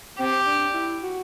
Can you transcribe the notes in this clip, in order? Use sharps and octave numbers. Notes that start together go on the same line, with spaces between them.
C4 G4
D4
E4
F#4